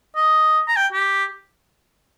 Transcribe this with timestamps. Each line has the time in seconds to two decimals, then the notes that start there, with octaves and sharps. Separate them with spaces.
0.16 D#5
0.68 A#5
0.76 G5
0.93 G4